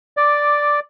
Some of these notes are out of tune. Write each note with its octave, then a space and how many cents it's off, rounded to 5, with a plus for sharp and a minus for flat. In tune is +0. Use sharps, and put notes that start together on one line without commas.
D5 +0 D6 +5